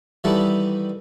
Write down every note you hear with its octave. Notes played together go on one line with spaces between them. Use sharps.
D#3 E3 G3 E4 A4 F#5